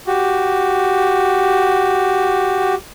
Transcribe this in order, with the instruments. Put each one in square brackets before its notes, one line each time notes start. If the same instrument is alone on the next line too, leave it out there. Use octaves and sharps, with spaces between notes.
[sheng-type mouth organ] F#4 G4